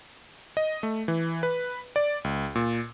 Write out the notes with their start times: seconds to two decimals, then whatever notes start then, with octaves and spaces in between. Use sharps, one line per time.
0.57 D#5
0.83 A3
1.08 E3
1.43 B4
1.96 D5
2.24 C#2
2.55 A#2